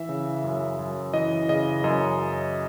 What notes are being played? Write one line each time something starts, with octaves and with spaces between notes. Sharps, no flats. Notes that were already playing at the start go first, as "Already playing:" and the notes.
Already playing: E3 E5
C#3
F#2
F#2
E3 D#5
C#3 D#5
F#2 D#5